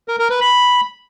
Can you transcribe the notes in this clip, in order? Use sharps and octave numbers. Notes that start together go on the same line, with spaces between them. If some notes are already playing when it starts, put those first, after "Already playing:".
A#4
A#4
B4
B5